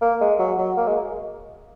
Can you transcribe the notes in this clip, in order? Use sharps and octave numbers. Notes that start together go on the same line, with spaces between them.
A#3
G#3
F#3
F#3
A#3
G#3